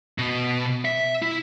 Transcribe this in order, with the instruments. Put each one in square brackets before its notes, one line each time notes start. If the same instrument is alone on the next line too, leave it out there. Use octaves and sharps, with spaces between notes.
[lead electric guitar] B2
E5
E4